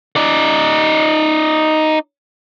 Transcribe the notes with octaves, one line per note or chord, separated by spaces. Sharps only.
D#4 D5